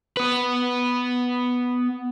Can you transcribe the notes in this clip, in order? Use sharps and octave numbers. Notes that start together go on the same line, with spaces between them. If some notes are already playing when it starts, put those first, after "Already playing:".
B3 B4